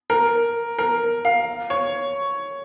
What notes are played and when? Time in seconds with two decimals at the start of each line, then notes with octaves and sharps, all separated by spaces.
0.10 A#4
0.79 A#4
1.25 F5
1.70 C#5